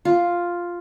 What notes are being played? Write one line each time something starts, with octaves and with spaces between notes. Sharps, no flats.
F4